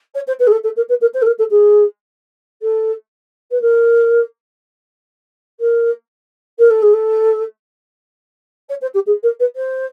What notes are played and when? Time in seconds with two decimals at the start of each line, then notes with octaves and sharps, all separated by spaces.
0.14 C#5
0.27 C5
0.39 B4
0.47 G#4
0.51 A4
0.63 A4
0.76 A#4
0.89 B4
1.01 A#4
1.14 C5
1.22 A4
1.26 A#4
1.38 A4
1.50 G#4
2.62 A4
3.51 B4
3.61 A#4
5.60 A#4
6.59 A#4
6.70 A4
6.82 G#4
6.93 A4
8.69 C#5
8.81 C5
8.94 G4
9.06 G#4
9.23 A#4
9.39 B4
9.56 C5